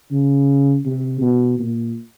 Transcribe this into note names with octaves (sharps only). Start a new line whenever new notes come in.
C#3
C3
B2
A#2